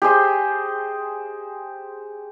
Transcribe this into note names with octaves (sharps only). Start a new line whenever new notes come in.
G4 G#4 C5 D#5